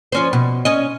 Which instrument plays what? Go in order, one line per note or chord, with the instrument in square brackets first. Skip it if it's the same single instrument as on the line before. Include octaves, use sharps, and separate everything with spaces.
[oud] F3 C#4 C5
B2
C#4 D#5